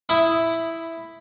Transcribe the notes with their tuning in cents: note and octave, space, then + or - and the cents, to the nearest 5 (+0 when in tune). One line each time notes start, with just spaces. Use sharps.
E4 +0 B5 +10 D#6 +5